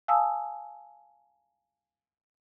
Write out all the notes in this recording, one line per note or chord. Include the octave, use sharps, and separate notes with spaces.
F5 G#5 A5 D#6 E6